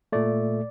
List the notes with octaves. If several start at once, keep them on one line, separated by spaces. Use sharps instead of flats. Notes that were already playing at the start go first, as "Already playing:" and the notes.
A#2 A3 D5